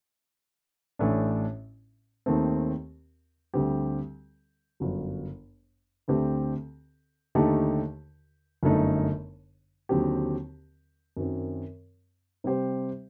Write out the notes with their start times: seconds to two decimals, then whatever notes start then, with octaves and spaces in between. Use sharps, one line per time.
0.99 A1 A2 A3 D4
2.26 D#2 D#3 A3 C4
3.54 D2 D3 G3 C4 G4
4.80 G1 F#2 F#3
6.08 D2 D3 A3 C4 G4
7.35 D#2 D3 A3 D#4 G4
8.63 G1 F#2 D3 A3 D#4
9.89 D#2 D3 F#3 C4 G4
11.17 F#2 D#3 F#3 C4
12.44 C3 G3 C4 G4 C5